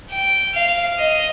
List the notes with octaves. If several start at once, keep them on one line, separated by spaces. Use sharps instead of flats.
G5
F5
D#5